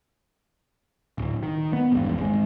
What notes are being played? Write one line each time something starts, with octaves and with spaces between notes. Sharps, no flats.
D1
D#3
B3
G#1 E2 G2
G#1 G#3